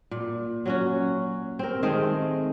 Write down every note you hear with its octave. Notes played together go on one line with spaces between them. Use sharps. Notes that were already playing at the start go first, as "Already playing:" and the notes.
A#2
F#3 C#4 F#4
C4 A#4
D#3 G#3 A3 C4